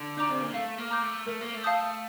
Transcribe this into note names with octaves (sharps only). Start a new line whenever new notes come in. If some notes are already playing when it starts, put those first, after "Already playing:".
Already playing: D3
D4 A#5 D6 G6
C4
A#3
A3 F5
A#3
A#5 D6 G6
A3
A3 A#4
A#3
A3
F5 A5 D#6 G6